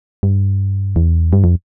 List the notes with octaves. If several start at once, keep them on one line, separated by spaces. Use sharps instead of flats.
G2
E2
G2
F2